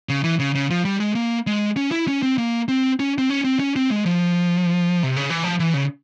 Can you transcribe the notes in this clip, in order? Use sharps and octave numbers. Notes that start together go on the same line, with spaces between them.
C#3
E3
C#3
C#3
F3
G3
G#3
A#3
G#3
C#4
E4
C#4
C4
A#3
C4
C#4
C4
C#4
C4
C#4
C4
G#3
F3
C3
C#3
E3
F3
E3
C#3